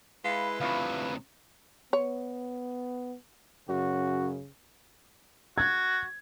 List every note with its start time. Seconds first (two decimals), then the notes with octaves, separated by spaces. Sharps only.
0.24 G#3 E4 F4 B4
0.61 D2 C3 F3 F4 C5 C#5
1.93 B3 C#5
3.69 F#2 C#3 F#4
5.58 F#4 G#6